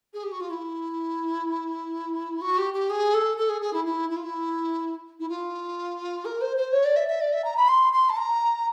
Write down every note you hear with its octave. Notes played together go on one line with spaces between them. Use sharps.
G#4
G4
F#4
F4
E4
F#4
G4
G4
G#4
A4
A4
G#4
G#4
E4
E4
E4
F4
E4
E4
F4
A#4
C5
C5
C#5
D5
E5
E5
D5
E5
A#5
B5
C6
C6
A5
A#5